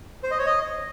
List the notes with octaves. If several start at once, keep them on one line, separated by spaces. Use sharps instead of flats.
C5
D#5
C#5
D#5